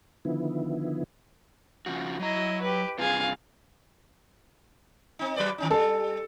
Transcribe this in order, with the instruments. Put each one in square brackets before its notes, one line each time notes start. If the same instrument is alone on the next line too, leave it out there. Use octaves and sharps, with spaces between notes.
[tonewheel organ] D3 D#3 F3 B3 E4
[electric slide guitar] C#3 F3 F#4
[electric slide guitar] F#3 A#5 [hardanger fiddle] E4 D#5
[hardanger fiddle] G4 B4
[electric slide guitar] G2 C3 F4 [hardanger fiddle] G#4 F5
[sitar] C4 D#4
F#3 B4 D5
D#3 C#4 D#4
[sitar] G3 [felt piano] A4